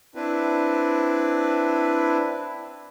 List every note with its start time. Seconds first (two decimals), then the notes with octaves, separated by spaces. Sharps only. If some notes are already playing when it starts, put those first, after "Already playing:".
0.15 C4 D4 E4 B4